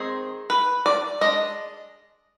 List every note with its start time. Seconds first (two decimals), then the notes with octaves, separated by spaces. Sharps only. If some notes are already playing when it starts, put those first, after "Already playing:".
Already playing: D#3 G#3 C4 D#4 G#4
0.50 B4
0.86 D5
1.21 G#3 D4 D#5